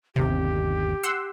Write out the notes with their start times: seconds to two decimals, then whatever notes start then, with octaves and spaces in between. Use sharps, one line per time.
0.16 G1 D#2 C3 G4
1.03 F#5 C6 E6